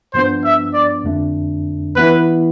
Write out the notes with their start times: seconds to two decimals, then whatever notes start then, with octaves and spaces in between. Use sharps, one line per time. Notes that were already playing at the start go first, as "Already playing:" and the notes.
0.14 G2 F3 B3 D4 C5
0.44 E5
0.74 D5
1.04 F2 D3 A3 D4
1.96 E3 B3 E4 B4